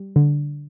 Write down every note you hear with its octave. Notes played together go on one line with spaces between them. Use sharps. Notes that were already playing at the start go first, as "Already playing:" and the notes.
Already playing: G3
D3